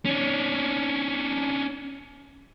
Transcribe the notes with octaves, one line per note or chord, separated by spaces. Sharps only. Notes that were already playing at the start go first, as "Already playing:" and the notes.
C#4 D4